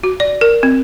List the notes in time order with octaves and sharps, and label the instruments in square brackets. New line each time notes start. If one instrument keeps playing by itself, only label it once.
[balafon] F#4
D5
A#4
C4